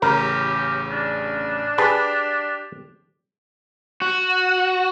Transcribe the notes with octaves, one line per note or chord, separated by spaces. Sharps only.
A1 C#3 G4 A#4
D4
G4 G#4 B4 A5
F#4